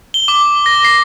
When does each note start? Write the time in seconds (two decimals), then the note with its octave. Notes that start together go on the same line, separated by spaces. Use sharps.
0.14 G7
0.28 D6
0.66 A#6
0.85 C7